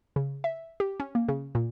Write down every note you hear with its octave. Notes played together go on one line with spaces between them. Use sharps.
C#3
E5
G4
C#4
A#3
C#3
A#2